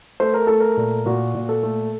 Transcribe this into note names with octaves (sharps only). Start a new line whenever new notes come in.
A3 C5
A#4
A3 A4
A#4
A#2
A#2 F#4
A#2
A4
A3